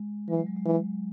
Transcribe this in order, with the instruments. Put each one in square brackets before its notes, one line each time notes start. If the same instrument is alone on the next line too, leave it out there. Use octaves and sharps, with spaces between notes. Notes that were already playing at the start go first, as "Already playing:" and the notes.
Already playing: [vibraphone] G#3
[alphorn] E3 [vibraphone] F#3
[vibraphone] G#3
F#3
G#3
[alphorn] E3